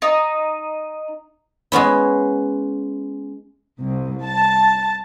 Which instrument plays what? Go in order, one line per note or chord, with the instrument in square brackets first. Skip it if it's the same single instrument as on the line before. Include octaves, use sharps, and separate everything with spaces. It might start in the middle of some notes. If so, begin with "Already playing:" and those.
[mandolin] D#4
[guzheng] G#3 B3 C#4 E4
[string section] C2
A5